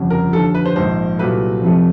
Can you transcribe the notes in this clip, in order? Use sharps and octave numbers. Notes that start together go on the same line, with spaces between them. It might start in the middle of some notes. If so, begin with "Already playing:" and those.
Already playing: G1 F2 C#3
A#4
D#2 D3 F3 A4
B4
C5
A#1 G#2 D#3 C5
C2 A#2 F#3 A3 B4
F2 C3 F3 A3